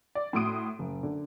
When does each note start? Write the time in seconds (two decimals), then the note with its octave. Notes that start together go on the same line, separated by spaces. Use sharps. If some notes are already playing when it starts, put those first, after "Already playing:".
0.15 D5
0.33 A2 F#4 C6 D#6 D7 D#7
0.79 F#1
1.03 D3